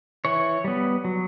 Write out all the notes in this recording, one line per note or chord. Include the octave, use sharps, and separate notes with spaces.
E3 C#5
G3 B3
F#3